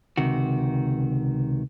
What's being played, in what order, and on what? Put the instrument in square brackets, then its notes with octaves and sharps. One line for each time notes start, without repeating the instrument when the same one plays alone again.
[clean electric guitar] C#2 C3 D#3 F#4